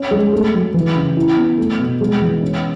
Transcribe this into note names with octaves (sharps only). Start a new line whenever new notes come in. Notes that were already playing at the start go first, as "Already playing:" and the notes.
Already playing: C#4
G#3
A3
F#3
E3
C#3
E4
B3
A3
B2
G#3
E3
C#4